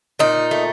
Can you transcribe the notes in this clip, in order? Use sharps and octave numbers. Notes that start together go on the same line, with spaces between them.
A#2 D#4
A3